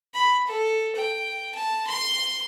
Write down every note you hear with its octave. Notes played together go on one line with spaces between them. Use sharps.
B5
A4
G5
A5
C6